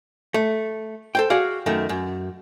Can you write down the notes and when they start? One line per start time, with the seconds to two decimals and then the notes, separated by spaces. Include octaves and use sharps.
0.34 A3
1.15 A4 C5 G5
1.30 F#4 G#4 D5 F5
1.66 F#2 D#3 A3
1.89 F#2